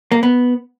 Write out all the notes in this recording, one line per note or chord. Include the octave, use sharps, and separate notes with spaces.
A#3
B3